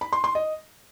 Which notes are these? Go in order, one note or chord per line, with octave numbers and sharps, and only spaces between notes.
B5
C6
C6
D#5